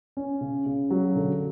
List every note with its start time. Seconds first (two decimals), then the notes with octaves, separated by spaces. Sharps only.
0.17 C#4
0.41 C#3
0.66 C#3
0.90 F#3
1.16 D3